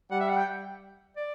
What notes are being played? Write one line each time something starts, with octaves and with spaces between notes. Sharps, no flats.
G3 F#5
E5
F#5
G5
D5